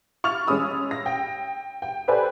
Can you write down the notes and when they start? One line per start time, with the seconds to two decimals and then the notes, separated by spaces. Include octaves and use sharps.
0.24 C#6 F6 A6 F7
0.47 G#3 C#4 G#4 B5 D#6 E6
0.91 A#6
1.06 G5
1.82 G5
2.08 G4 A4 B4 C5 D5 G#5